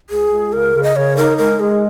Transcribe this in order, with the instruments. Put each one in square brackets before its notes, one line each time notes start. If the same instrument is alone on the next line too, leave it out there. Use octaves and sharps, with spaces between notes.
[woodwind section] C#2 [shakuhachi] G#4
[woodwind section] C#2
[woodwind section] C#3 [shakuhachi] A#4
[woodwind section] C#3
[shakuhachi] D#5
[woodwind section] C#3 [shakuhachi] C#5
[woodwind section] D#4 [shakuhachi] A#4
[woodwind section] G#3 [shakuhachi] A#4
[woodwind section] G#3 [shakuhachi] G#4